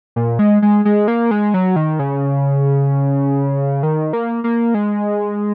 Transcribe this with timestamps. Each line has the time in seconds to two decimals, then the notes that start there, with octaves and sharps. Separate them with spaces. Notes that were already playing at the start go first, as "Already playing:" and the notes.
0.16 A#2
0.39 G#3
0.62 G#3
0.85 G#3
1.08 A#3
1.31 G#3
1.54 F#3
1.76 D#3
1.99 C#3
3.83 D#3
4.13 A#3
4.44 A#3
4.74 G#3